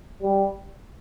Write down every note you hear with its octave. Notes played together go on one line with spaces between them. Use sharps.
G3